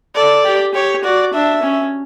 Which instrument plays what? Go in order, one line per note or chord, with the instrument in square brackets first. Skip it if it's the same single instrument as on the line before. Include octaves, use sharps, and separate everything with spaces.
[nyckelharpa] A4 [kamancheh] D5
[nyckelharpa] G4
[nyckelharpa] G4 [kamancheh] C#5
[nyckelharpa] F#4 [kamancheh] D5
[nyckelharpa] D4 [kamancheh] E5
[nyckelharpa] C#4